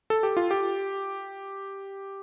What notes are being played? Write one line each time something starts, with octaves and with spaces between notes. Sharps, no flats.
A4
G4
F4
G4